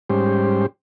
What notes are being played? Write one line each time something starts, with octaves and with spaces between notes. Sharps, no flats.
G#2 G3 C#4 G4 C5